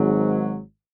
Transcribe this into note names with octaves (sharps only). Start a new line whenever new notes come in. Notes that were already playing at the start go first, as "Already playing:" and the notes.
Already playing: G#1 G#2 F#3